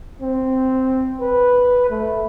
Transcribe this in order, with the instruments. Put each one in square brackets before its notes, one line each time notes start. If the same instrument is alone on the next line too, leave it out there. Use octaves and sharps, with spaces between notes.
[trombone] C4
B4
A3